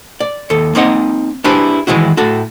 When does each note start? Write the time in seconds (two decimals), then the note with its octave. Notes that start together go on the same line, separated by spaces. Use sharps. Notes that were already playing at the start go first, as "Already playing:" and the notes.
0.20 D5
0.50 D#2 A4
0.75 A#3 C4 D#4 D#5 F#5
1.44 D4 E4 G4 G#4 B4 C5
1.87 D#3 E3 G#3 E4 F#4
2.17 A2 F#4 A4